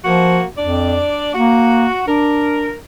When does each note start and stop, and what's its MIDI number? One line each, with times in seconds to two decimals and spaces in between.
0.04 0.41 53
0.04 0.44 58
0.04 0.44 66
0.58 1.06 41
0.58 1.32 62
0.58 1.32 74
1.34 1.88 58
1.34 2.04 66
2.06 2.71 62
2.06 2.76 70